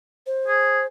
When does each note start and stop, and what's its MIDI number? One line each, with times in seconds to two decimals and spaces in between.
0.27 0.86 72
0.47 0.81 68